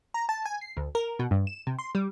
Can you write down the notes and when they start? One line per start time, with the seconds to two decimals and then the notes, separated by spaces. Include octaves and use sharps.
0.14 A#5
0.29 A5
0.45 G#5
0.61 C7
0.77 D2
0.95 A#4
1.19 B2
1.31 G2
1.47 E7
1.67 C3
1.79 C6
1.95 G3